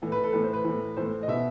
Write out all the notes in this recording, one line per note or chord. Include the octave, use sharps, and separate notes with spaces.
A2 E3
B4
A4
A2 E3 B4
C5
B4
A2 E3
A2 E3 C5
D#5
B2 E5